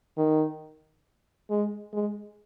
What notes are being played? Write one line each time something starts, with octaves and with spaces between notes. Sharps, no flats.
D#3
G#3
G#3